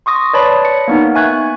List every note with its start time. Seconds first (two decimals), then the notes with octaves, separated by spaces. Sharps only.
0.06 C6 C#6 D#6 A#6
0.33 B4 C#5 D5 A5 B5
0.65 C#7
0.88 A#3 B3 D#4
1.15 E5 G#5 C#6 F#6 G#6